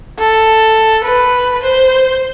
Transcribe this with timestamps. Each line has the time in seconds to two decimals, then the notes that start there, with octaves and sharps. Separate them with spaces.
0.19 A4
1.04 B4
1.63 C5